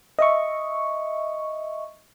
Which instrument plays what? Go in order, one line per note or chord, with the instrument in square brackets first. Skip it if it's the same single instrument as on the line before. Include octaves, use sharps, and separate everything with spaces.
[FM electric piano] D#5 E5 C#6